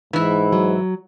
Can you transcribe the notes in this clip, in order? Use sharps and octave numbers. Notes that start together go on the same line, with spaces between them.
G#2 E3 E4
F#3